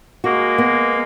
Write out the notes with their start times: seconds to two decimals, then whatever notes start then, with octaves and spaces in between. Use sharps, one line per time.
0.24 G#3 A#3 F#4
0.58 B3